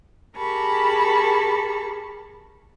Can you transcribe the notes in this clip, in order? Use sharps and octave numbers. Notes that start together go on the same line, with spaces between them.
G4 G#4 A#4 A5 B5 C#6